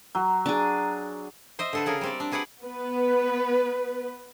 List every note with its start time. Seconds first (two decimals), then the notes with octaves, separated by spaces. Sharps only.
0.15 F#3
0.46 D4 G#4
1.59 C5 D#5 E5
1.73 D3 A4 B4
1.86 C#3 G#4 A#4
2.01 G3 C4 D5
2.20 D4
2.32 F#4 G#4 B4 D5 F#5
2.62 B3 B4